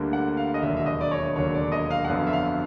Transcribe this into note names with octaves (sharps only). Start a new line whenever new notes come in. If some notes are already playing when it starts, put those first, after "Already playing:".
Already playing: D2 D3 G3 A#3
F#5
F5
D#5
E1 D#2 D3 F#3 A#3 E5
E5
D#5
D5
C#5
E1 D#2 D3 F#3 A#3 C#5
D5
D#5
F5
F#5
G1 F2 D3 F#3 B3 F5
E5
F5